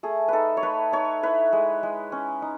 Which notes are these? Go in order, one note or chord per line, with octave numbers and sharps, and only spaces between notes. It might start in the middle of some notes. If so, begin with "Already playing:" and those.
A3 G#4
D#4 A4 B4
C#5
A3 B4
D#4 C#5
E4 B4
G#3
G#3
C#4
D#4